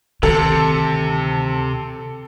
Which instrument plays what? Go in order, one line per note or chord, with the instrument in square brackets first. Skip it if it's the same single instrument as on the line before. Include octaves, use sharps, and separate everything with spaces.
[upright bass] D2 D#3 [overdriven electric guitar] C3 [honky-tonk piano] A4